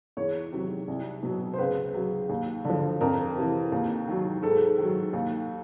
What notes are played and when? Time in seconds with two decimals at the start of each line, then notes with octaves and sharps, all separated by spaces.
0.17 E2 C#5
0.52 C3 D#3 F#3
0.88 C2
1.23 B2 F#3
1.54 C5
1.58 C#2 B4
1.94 C#3 F#3
2.29 D#2
2.65 D3 F3
3.01 F2 A#4
3.36 C3 E3
3.72 D#2
4.08 D#3 F#3
4.42 G#2 A4
4.78 D#3 F#3
5.13 D#2